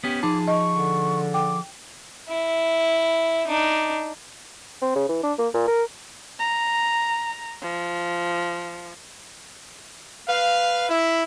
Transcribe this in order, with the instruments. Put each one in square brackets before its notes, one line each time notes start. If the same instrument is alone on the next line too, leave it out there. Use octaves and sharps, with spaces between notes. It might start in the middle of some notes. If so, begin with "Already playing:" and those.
[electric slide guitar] B3 C#4 G4
[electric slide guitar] F3 G#4 A5 [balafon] D#4 [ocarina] D6
[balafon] D#5 [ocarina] C#6
[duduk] D3
[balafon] G5 [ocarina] D6
[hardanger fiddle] E4
D4 D#4
[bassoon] C4
C#3
E3
D4
A#3
A#2
A#4
[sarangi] A#5
F3
[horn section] B4 F5
E4